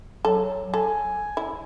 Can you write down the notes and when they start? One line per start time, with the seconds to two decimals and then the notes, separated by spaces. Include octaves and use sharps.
0.25 F#3 A4
0.74 A4 G#5
1.37 E4